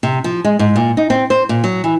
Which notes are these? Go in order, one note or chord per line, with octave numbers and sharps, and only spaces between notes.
C3
F3
G#3
G#2
A#2
D#4
C4
C5
A#2
F#3
E3